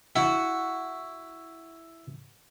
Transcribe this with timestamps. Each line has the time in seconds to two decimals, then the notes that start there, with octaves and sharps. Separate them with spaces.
0.16 E4 F#4